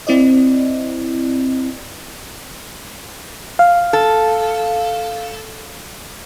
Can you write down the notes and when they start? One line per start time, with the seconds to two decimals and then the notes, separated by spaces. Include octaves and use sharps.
0.07 C4 E4 D5 D#5
3.59 F5
3.93 A4